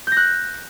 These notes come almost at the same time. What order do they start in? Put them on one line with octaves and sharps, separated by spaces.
G6 A#6 F#6